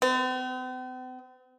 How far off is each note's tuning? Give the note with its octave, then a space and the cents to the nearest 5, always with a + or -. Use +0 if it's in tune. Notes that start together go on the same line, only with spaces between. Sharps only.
C4 -45